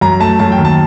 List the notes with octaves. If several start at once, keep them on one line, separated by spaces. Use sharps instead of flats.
F#2 A#5
A3 A5
F#2 A5
G5
D#2
A5